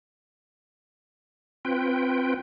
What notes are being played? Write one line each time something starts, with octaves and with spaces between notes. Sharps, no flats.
C4 F4 B4 G5